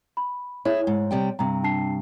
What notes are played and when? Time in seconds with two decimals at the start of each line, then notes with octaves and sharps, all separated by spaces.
0.17 B5
0.65 E4 G#4 C#5
0.87 G#2
1.11 C3 G3 G5
1.39 G2 C3 A#5
1.63 D4 A5 C7